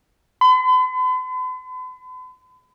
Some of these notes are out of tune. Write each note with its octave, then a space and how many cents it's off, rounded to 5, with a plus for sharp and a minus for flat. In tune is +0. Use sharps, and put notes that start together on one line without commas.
B5 +45